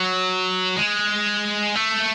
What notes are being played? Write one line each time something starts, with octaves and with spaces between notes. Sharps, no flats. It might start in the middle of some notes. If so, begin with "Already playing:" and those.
Already playing: F#3
G#3
A3